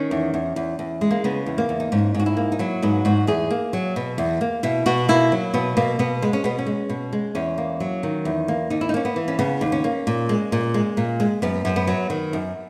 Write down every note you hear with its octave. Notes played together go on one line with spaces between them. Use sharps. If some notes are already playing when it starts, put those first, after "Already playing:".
Already playing: D#3 C#4
E2
E2
E2
E2
G#3
A#3
C#3 B3
E2
A#3
E2
D#4
G#2 C#4
G#2 F#4
E4
A#3
D#4
F#3 E4
G#2 B3
G#2 F#4
E2 G#4
A#3
F#3
B2
E2
A#3
B2 E4
B2 F#4
A#3 E4
F#3
B2 B3
B2 A#3
B2 B3
G#3
C#4
B2 B3
C#4
G#3
B2
G#3
E2 C#4
A#3
F#3
D#3
E2
A#3
D#2 D#4
E4
D#4
A#3 C#4
B3
E3
C#4
C#3 B3
D#2
C#4
A#3
A#2
G#3
A#2
G#3
A#2
G#3
F#2 B3
F#2
B3
F#3
D#3
F#2